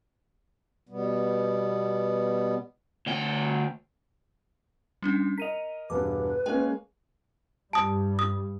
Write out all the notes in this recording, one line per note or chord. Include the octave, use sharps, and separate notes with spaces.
B2 G3 B3
D2 G5
G3 C#4 D4 C#7
A#4 D#5 B6 D#7 F7
E1 G2 B4 D6
G#3 A#3 C#4 A#4 G5
G2 G3 A5 D#6
D#6